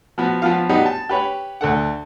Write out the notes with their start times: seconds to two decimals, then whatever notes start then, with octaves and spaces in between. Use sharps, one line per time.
0.18 F3 B3 F#4
0.42 F3 B3 F4 F5
0.69 F#3 G3 B3 D#4 F#4 G4
0.86 A5
1.09 G4 B4 C#5
1.61 D2 A4 F#5